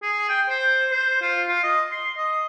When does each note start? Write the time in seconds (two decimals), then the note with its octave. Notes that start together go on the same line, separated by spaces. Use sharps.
0.02 G#4
0.29 G5
0.49 C5
0.91 C5
1.21 F4
1.48 F4
1.63 D#5
1.91 C6
2.17 D#5